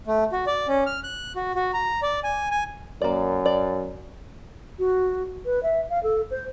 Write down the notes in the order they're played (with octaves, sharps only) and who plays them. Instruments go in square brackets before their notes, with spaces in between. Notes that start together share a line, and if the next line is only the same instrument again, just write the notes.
[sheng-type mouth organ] A3
F#4
D5
C#4
F6
F#6
F#4
F#4
A#5
D5
G#5
G#5
[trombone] F#2 [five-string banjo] A#3 D5
[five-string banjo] D5
[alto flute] F#4
B4
E5
F5
A4
C5